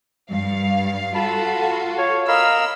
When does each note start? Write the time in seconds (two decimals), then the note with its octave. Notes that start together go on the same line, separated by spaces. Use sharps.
0.29 G2 F5
1.15 F4 F#4 A4 A5 B5
1.98 C#5 F5
2.28 A#4 D#5 F5 B5 E6